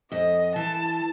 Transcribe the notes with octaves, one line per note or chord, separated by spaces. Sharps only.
F2 D#5
E3 A5